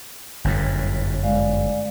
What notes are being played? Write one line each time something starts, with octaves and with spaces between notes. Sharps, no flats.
G1 F#2 A2
G#3 D5 F5